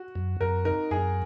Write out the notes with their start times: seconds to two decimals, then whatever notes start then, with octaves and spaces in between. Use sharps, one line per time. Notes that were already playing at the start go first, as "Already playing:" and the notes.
Already playing: F#4
0.15 F#2
0.41 F#2 A#4
0.65 D#4 A#4
0.91 F#2 G#4